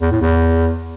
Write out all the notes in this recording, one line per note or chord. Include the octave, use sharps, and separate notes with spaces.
E2
A2
E2